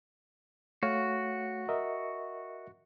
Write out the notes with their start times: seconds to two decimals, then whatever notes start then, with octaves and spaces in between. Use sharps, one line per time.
0.83 A3 F#4 C#5 F5
1.69 A#4 D#5 E5